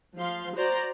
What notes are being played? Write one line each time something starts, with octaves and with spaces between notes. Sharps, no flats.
F3 F5 C6
F#4 C5 D5 A#5